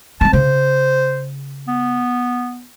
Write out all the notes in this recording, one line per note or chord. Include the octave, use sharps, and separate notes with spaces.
G3 C4 A5
C#3 C5
B3